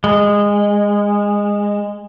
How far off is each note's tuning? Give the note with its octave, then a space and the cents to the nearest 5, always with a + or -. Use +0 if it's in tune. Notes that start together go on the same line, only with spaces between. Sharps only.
G#3 -20